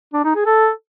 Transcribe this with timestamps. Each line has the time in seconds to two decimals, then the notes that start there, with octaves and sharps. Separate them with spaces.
0.13 D4
0.24 D#4
0.35 G#4
0.46 A4